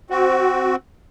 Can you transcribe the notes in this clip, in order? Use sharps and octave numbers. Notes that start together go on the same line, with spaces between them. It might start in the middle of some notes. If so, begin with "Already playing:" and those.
C4 F#4